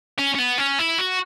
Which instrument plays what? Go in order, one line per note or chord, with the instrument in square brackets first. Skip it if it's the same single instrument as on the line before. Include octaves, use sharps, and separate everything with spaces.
[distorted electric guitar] C#4
C#4
B3
C#4
E4
F#4